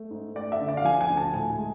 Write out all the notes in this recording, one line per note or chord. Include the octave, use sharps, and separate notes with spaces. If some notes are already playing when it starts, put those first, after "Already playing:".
Already playing: A3
G#2
A3 D5
E5
D3
D5
F5
F3 G#5
G#5
D2
A5
A2 G#5
G#3